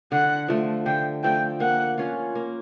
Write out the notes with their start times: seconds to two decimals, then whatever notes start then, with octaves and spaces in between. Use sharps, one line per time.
0.12 D3 F#5
0.48 F3 A3
0.86 D3 G5
1.24 F3 A3 G5
1.60 A#3 F#5
1.98 C#4 F4
2.35 A#3